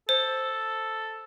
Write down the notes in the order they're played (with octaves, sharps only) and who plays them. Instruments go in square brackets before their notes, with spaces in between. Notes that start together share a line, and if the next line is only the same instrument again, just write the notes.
[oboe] A4 [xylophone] C5